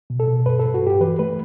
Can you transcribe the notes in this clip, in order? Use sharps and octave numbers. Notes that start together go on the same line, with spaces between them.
B2
A4
B2
G2 B4
A4
G2
F#4
G2 G4
E3 B4
A3 B4